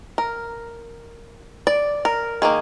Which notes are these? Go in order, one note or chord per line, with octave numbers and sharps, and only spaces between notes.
A#4
D5
A#4
D#3 A#3 G#4